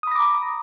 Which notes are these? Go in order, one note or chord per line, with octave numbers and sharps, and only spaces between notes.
A#5 B5 D6 D#6 A#6